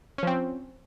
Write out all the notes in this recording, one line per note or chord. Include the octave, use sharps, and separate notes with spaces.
F3 C4 C#4